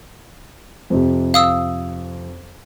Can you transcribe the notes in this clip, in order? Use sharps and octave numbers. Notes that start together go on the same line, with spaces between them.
F2 C3
F5 D#6 E6